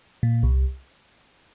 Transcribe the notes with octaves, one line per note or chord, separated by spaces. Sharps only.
A#2
C2